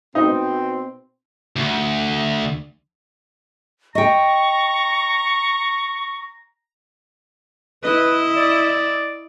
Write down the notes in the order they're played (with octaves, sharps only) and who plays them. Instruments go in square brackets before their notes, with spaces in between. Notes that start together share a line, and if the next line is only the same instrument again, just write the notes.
[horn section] B2 C4 [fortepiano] D#4
[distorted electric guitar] D2
[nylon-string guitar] D#5 G5 [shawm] A#5 [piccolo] C#6
[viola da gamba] E4 D#5 [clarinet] B4
[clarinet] D5